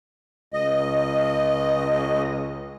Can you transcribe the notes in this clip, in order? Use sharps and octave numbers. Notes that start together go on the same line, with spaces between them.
C#2 D#5